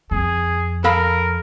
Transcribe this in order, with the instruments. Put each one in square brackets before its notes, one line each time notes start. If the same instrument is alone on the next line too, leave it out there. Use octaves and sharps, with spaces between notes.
[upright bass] F2 [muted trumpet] G#4
[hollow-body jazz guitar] A4 F5 B5 [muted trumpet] A#4